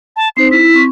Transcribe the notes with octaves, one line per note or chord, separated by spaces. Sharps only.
A5
C4 D#4 C5 C7
E4 B6
C4 C#6